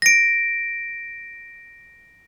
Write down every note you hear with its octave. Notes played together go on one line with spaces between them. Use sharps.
A#6 D7